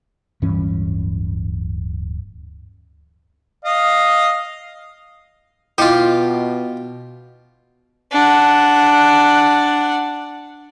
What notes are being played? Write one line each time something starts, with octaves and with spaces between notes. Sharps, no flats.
D1 G2 E3 C#4
D#5 F5
B2 E4 F4 G4 D#5
D4 F#5